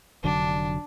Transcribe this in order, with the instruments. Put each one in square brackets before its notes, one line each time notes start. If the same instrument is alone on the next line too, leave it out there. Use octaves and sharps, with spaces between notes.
[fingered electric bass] F1 D3 F#3 [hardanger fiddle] D4